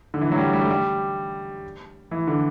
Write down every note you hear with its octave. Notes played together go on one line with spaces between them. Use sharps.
D3
E3
F#3
G3
G3
A3
G3
E3
D3